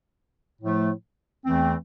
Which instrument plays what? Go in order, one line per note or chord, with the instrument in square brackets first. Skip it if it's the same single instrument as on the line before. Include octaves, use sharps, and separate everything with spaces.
[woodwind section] A2 F3 A3
E2 E3 A3 C4